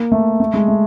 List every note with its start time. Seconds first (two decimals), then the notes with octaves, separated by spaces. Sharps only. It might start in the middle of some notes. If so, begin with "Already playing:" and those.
Already playing: A#3
0.12 A3
0.40 A3
0.54 G#3
0.68 A3